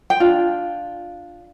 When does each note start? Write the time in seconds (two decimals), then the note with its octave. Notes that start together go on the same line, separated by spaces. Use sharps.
0.10 G5
0.20 D4 F4